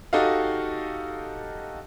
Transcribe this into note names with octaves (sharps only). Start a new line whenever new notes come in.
D#4 F#4 G4 A4 D#5 F5